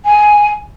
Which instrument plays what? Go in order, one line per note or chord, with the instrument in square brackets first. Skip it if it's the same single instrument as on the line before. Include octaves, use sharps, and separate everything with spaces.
[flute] G#5